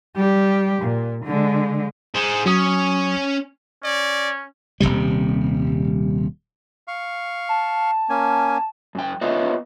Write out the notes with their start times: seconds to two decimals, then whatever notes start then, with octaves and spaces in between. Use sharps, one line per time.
0.16 G3 G4
0.82 A#2
1.25 D3 G#3
2.15 G#4 C5
2.46 F#3 C#4 D#6
3.84 C#4 D5
4.80 D#1 C2 C3 G3
6.88 F5 C#6
7.49 A5
8.09 A#3 C#4 G#5
8.95 F#2 G5
9.21 B3 F4 B4 C#5 D#5 E5